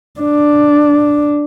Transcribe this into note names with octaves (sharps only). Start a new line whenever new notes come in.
D4